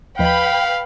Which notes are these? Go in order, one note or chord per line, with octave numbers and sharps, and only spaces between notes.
D#2 F3 B4 D#5 F5 G5 B5